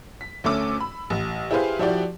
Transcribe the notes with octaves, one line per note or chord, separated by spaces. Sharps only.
B6
D2 A3 C#4 D6 E6
B5
A1
E4 G4 G#4 B4 C5 F5
F3 E4 F#4 G4 D5